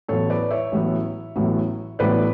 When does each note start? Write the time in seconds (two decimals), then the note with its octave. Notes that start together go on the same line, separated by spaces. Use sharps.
0.08 A1 A2 F#3 B3 A4 C#5
0.30 B4 D5
0.51 C#5 E5
0.72 A1 A2 F#3 B3
1.36 A1 A2 F#3 B3
1.99 A1 A2 F#3 B3 B4 D5